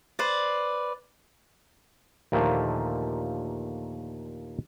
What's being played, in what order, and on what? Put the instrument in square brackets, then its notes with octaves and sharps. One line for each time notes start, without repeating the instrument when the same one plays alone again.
[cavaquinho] B4 C5 D5
[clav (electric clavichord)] D#2 A#2 D3 F3 A3 A#3